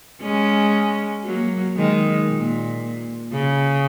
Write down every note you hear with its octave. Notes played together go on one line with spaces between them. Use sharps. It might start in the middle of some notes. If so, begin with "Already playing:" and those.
G#3 C#4
F#3 A#3
D#3 G#3
A#2
C#3